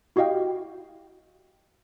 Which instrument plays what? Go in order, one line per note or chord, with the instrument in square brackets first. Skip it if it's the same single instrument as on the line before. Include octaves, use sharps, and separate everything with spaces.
[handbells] E4 F#4 G4 D#5 F5 G5